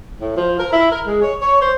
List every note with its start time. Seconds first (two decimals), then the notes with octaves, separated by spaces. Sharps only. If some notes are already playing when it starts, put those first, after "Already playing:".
0.21 A2
0.36 F3
0.58 A#4
0.73 E4
0.91 A#4
1.07 G#3
1.22 C#5
1.41 C#5
1.61 C5